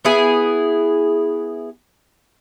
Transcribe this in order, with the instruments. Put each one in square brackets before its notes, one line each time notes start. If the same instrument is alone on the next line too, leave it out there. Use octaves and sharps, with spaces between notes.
[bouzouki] B3 E4 G#4